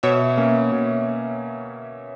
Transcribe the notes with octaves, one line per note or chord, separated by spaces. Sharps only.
B2 C#5 E5
A#3 C#4
B2